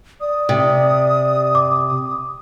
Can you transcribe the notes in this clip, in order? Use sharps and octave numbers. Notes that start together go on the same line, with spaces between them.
D5 D#6
C3
D6